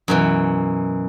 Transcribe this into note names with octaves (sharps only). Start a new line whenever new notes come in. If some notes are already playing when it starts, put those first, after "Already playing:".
F#2 B2 E3